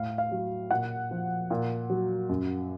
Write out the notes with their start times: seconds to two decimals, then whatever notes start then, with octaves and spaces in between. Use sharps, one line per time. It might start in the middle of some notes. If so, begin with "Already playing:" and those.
Already playing: A2 F5
0.18 F5
0.31 F#3
0.71 A#2 F#5
1.11 F3
1.50 A#2
1.90 F#3
2.29 F#2